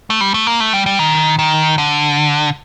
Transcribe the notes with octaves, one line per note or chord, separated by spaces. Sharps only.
A3
G3
A3
A#3
A3
G3
G3
D#3
D#3
D3